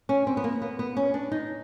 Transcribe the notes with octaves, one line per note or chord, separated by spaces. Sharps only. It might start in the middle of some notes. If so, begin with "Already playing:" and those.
C#4
C4
B3
A#3
B3
B3
C#4
D4
D#4